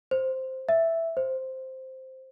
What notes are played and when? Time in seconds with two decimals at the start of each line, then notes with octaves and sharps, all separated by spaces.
0.11 C5
0.69 E5
1.17 C5